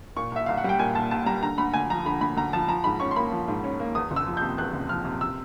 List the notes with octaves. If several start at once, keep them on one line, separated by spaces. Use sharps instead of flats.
A#2 C#6
C2 E5
C2 F5
F#5
G3 G5
A#2 G#5
C2 A5
C2 A5
G3 A#5
D3 A#5
D2 B5
D2 G#5
F3 A#5
D3 B5
D2 B5
D2 A#5
F3 A5
F3 A#5
G#2 B5
C#4 C#6
C6
A#3 B5
F3
G#2
C#4
A#3
E2 D#6
F#1
E6
F3
C3 G6
E2 F#6
F#1
F3 F6
C3
E6